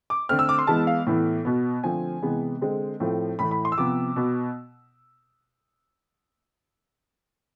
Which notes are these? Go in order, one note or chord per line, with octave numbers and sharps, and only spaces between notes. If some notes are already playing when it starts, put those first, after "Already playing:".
D6
D3 A3 C4 F6
E6
D6
C6
E3 G#3 B3 A5
F5
A2 E3 B3
B2 B3
D3 F3 A3 C4 G#5
C3 E3 G#3 B3
D3 G#3 C4
A2 F3 A3 C4
A2 E3 A3 B5
B5
C6
E6
C3 F3 B3 D6
B2 B3